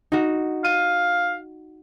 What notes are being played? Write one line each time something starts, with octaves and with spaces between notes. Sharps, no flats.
D#4 F#4
F5 D#7